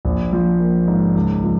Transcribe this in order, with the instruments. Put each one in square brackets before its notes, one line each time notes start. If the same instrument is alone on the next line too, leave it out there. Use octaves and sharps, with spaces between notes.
[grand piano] A#1
F3
A#3
G#2
C#2
F3